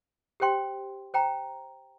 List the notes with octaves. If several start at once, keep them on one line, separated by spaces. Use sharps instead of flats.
G4 C5 G5 C6
C5 G5 A#5